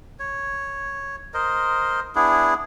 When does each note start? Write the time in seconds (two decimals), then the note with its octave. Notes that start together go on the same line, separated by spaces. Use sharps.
0.20 C#5
1.34 A#4 C5 D#5
2.15 B3 D4 E4 G#4